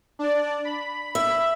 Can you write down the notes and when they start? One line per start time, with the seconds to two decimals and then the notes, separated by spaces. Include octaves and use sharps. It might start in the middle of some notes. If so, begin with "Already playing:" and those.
0.19 D4 D5
0.65 B5
1.15 E5